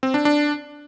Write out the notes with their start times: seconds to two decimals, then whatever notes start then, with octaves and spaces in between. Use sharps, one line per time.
0.03 C4
0.14 D4
0.25 D4